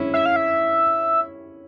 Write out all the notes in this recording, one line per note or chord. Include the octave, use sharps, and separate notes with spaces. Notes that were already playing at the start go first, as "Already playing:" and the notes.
Already playing: C#4 E4
E5
F5
E5